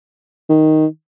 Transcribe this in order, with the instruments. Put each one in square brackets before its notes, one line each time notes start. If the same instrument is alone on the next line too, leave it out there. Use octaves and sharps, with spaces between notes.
[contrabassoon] D#3